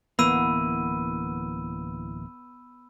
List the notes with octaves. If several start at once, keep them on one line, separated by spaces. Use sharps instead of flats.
D1 E3 A#3 B3 B5 E6 D#7